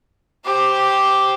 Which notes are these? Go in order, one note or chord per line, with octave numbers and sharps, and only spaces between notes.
G4 C5